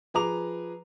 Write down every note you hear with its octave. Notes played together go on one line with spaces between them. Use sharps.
F3 G#4 B4 A#5 D6 F7